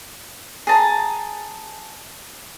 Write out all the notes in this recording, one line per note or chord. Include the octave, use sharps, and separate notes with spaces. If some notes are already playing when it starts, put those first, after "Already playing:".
G#4 A5 A#5